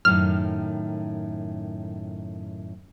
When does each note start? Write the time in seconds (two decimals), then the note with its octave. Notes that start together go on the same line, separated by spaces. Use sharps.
0.05 F#2 A2 D#3 F6